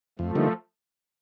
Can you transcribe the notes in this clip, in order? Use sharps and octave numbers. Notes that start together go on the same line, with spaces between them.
F2 F3 A3
D3 G3 A#3 D#4